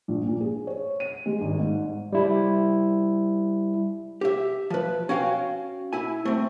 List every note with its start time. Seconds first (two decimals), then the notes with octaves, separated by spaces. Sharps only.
0.08 A#1
0.26 A#2
0.41 G#4
0.67 C#5
1.00 D#7
1.26 G#3
1.41 G#1
1.60 G#2
2.13 G3 E4
4.21 G4 E5
4.70 F3 B4
5.09 C#4 F#4 F5 G5
5.93 E4 G#5
6.25 A3 C4